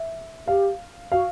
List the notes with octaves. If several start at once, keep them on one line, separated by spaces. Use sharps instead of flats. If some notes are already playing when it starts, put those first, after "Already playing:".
Already playing: E5
G4 F5
F#4 F5